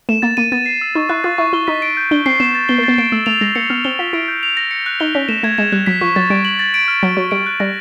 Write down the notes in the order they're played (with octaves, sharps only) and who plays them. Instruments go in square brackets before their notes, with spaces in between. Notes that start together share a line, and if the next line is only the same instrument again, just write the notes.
[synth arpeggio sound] A3 [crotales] E7
[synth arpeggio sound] A#3 [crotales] A6
[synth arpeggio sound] A#3 [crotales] D#7
[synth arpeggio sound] B3 [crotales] A6
[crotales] C7
E6
[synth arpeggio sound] D#4 [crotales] C#6
[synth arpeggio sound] E4 [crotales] F#6
[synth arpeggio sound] F4 [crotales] A6
[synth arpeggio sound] E4 [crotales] C#6
[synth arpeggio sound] E4 [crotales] G7
[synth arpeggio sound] D#4 [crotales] B6
[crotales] D7
G6
[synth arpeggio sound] D4 [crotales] G7
[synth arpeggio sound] C4 [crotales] C7
[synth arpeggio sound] B3 [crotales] E7
[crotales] A6
[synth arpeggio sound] B3 [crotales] G7
[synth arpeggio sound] A#3
[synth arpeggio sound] B3 [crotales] A6
[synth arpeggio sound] A#3 [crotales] D7
[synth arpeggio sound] A3 [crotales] E6
[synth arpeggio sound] A3 [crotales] F7
[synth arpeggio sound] G#3 [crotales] A#6
[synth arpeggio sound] A#3 [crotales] C#7
[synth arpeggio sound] B3 [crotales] F6
[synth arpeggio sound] C4 [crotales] G7
[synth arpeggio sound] F4 [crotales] B6
[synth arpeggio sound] E4 [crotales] D7
[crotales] G6
F7
A#6
C#7
F#6
[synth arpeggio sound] D#4 [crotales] G7
[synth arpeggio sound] C#4 [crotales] B6
[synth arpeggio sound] A3 [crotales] E7
[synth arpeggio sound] A3 [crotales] G#6
[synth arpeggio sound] G#3 [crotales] E7
[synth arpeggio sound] G3 [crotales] F#6
[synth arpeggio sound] F#3 [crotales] B6
[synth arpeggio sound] F3 [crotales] C#6
[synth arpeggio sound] F#3 [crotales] A6
[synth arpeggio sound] G3 [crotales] D7
[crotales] F#7
A6
D7
F6
[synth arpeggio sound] F#3 [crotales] A6
[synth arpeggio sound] F#3 [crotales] C#6
[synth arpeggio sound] G3 [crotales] D7
[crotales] F#6
[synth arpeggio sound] G3 [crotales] A#6